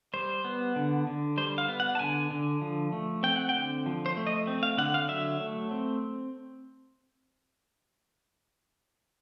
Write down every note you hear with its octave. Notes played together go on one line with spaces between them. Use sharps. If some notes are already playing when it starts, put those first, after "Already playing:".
G3 C5
B3
D3
D3
G3 C5
F5
B3
F#5
A5
D3 G#5
D3
F3
A3
C4 G5
F#5
G5
D3
F3
C5
A3
D#5
C4
F5
D3 F#5
F5
F#3 E5
A3
C4